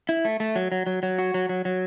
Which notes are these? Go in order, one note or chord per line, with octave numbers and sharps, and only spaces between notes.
E4
A3
A3
F#3
F#3
F#3
F#3
F#4
F#3
F#3
F#3